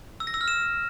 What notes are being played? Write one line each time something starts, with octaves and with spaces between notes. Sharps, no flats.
E6
A#6
E6
F6
E7